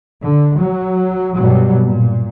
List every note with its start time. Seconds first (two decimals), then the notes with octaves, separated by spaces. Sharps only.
0.22 D3
0.57 F#3
1.38 G2 B2 F#3 G3
1.83 A#2